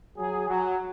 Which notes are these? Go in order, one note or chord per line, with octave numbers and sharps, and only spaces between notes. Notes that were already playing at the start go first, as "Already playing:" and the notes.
F#3 G#4
F#3